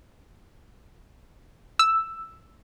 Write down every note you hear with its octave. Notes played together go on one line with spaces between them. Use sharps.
E6